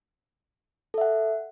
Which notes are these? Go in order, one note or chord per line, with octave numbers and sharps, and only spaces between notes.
A4 E5 F#5